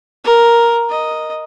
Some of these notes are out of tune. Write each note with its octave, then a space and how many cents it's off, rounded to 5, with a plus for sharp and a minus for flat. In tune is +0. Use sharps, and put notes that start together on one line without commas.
A#4 +5
D#5 +0